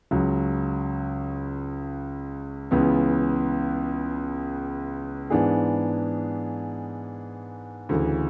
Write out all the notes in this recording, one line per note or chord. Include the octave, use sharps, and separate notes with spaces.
C#2 C#3 F#3
C#2 C#3 E3 B3
G#2 E3 B3 D4 G#4
D2 C#3 E3